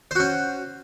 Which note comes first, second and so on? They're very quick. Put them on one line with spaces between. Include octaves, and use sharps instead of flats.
C5 F#4 C#4